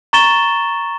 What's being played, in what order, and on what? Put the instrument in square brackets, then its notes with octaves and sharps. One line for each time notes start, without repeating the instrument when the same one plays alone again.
[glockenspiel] A#5 C#6 A6 E7 G7